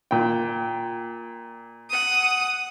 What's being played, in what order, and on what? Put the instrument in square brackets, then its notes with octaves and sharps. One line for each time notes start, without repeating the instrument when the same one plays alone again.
[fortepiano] A#2 G5
[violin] F#5 D#6